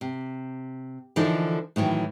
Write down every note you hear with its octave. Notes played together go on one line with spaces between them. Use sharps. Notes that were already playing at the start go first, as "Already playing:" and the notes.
C3
D3 E3 F3 D#4 A4 A#4
A2 D#3 E3 F#3